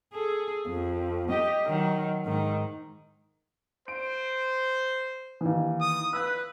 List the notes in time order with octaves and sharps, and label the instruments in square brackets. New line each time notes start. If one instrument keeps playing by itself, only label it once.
[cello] G#4 A4
F2
G4 D#5
D#3 F#3
G#2 D#3
[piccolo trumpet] C5 [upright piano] D7
[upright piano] D#2 E3
[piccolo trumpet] D#6
[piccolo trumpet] B4 [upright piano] E6 F#6